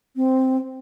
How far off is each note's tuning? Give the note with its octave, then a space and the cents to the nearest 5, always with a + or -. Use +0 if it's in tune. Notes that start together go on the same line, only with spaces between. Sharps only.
C4 -5